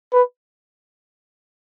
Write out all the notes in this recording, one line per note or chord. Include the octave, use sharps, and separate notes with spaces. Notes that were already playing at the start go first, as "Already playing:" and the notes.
B4